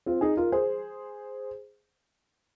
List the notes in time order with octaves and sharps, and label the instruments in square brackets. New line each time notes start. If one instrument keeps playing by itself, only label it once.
[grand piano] C4 F4
D#4 G#4
F4 A#4
G#4 C5